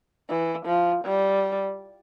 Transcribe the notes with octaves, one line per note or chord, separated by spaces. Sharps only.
E3
F3
G3